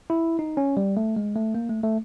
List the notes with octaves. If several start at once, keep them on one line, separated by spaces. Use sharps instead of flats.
E4
D#4
C#4
G3
A3
G#3
A3
A#3
A3
A3